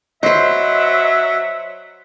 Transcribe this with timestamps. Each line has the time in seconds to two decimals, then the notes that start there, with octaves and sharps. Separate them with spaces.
0.23 F#3 B4 C5 D#5 E5